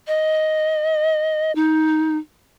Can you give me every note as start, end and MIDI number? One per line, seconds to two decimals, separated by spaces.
0.07 1.52 75
1.55 2.18 63